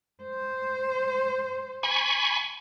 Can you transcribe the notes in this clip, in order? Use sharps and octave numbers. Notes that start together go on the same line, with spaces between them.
C5
G#5 B5 C#6